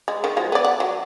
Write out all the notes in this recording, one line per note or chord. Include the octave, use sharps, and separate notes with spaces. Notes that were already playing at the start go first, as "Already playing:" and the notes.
G#3
D#3
F3 G#3 F#4
B3 D5
F#5
F#3